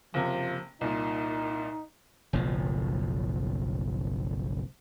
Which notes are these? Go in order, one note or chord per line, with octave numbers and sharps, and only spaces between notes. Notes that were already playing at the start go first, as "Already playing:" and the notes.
F#1 C3 F3
C2 A#2 D#4
F#1 B1 A2 F3